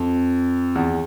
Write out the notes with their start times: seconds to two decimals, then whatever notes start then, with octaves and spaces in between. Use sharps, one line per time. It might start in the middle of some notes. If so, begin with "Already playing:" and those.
Already playing: F2
0.75 E2